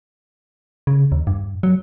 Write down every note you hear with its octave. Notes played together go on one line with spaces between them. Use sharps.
C#3
D#2
G2
F#3